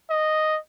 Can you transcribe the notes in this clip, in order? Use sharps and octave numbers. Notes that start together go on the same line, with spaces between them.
D#5